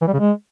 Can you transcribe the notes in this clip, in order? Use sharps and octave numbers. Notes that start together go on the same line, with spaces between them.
E3
G3
C#3
G#3